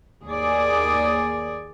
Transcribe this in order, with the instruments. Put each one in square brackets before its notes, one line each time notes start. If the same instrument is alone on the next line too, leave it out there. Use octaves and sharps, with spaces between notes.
[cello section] D#2 G#4 D5